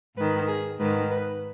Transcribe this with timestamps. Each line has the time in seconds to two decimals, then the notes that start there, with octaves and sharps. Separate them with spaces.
0.16 G#2 D#3 B4
0.48 G#4
0.79 G#2 D#3 B4
1.11 B4